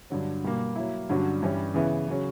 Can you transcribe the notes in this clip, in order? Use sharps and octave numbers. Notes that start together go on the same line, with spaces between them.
G2 D3 F#3
B2 G3 A#3
F#3 A#3 E4
G2 D3 F#3 C#4 F#4
G2 E3 G3 C#4 G4
C#3 E3 B3 E4
C#3 F#3 C#4